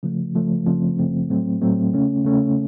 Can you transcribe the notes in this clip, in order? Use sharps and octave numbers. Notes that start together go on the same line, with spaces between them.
C#3 F3 A3
C#3 F3 A3
F#2 C#3 F3 A3 C4
F#2 C#3 F3 A3 C4
A2 F#3 A3 C4
A2 F#3 A3 C4
C#3 A3 C#4
C#3 A3 C#4